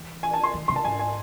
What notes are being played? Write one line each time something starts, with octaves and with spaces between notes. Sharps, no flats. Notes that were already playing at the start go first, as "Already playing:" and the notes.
Already playing: E3
G#5
A5
C6
D#3
C#3 C6
A5
G#2 G#5
G#5